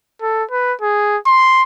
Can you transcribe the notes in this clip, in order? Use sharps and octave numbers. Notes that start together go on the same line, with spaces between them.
A4
B4
G#4
C6